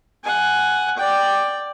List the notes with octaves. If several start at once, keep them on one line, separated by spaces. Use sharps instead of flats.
F#5 G#5
D5 G5